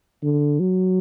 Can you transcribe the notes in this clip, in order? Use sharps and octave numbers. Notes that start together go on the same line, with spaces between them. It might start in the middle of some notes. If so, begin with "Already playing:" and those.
D3
F#3